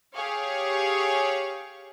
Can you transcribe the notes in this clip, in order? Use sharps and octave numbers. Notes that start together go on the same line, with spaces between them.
G4 G#4 C#5 F5 C#6